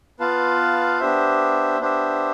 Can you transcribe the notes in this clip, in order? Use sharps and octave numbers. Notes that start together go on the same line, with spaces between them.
B3 F4 B4 F5 A5
B3 D4 G4 C5 E5
B3 D4 G4 C5 E5